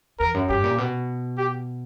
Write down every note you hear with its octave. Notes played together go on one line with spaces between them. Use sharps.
E2 A#4
F#2
G2 G4
A#2
B2
G4